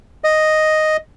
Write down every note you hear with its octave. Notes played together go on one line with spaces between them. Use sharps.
D#5